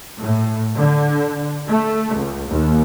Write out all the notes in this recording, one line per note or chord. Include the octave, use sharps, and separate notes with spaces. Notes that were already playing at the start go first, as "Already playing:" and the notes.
A2
D3
A3
C#2
D#2